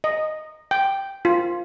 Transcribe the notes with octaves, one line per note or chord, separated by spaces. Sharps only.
D#5
G5
F4